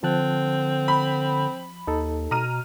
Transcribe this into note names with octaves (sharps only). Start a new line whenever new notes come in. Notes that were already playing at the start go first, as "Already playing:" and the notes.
D3 F3 C4 A5 F#6
B5
D#2 D#4 A4
B2 A#5 F6 D#7